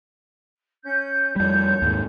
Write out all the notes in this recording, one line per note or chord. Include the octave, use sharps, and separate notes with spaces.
C#4 G6
F2 G3 C#5 G6
D#2 G#2